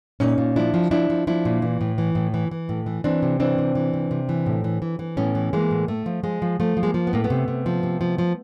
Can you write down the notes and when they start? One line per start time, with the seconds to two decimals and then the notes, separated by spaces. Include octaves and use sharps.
0.20 A#2 C#4 D#4
0.38 A#2
0.56 F3 D4 E4
0.74 F3
0.91 F3 D4 E4
1.10 F3
1.27 F3 D4 E4
1.45 A#2
1.62 E3
1.81 A2
1.98 E3
2.15 A2
2.34 E3
2.51 E3
2.69 A2
2.86 E3
3.04 E3 C4 D4
3.22 C3
3.40 E3 C4 D4
3.58 C3
3.75 E3
3.94 C3
4.11 C3
4.29 E3
4.46 A2
4.64 E3
4.82 E3
4.99 E3
5.17 A2 B3 C#4
5.35 E3
5.53 E3 G#3 A#3
5.71 A2
5.88 A2 A3
6.06 F3
6.23 F3 G#3
6.42 F3
6.60 F3 A3
6.77 F3
6.83 G#3 A#3
6.94 F3
7.07 B3
7.13 A2 A#3
7.24 A3 B3
7.30 C3
7.48 C3
7.66 F3
7.83 C3
8.01 F3
8.18 F3